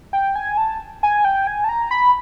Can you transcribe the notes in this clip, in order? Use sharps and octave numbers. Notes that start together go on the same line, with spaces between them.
G5
G#5
A5
G#5
G5
G#5
A5
A#5
B5